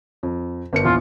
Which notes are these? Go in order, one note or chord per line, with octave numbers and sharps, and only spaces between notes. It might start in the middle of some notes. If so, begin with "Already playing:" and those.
F2
G1 A#4 C#7
A#1 E2 F4